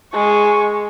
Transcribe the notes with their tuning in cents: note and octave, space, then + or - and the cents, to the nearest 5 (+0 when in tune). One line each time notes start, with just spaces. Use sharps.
G#3 +0 C#6 +0